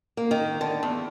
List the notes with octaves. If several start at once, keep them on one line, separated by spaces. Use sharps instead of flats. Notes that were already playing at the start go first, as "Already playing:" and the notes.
A#3
D#3
D3
E2